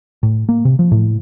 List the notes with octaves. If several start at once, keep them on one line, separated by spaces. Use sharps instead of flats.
A2
A#3
C3
F3
A2